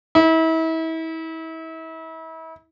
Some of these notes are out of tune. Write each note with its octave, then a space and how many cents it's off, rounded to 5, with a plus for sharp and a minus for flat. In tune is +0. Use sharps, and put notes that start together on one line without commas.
E4 -35